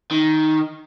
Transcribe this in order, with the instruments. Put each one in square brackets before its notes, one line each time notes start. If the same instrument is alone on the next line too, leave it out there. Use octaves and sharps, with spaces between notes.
[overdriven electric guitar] D#3